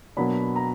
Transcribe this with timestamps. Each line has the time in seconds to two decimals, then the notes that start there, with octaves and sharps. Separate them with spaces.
0.17 B2 F#3 A#3 D4 B5
0.56 A#5